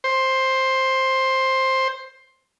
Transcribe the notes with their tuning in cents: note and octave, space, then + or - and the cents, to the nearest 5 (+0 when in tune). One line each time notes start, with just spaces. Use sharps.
C5 +10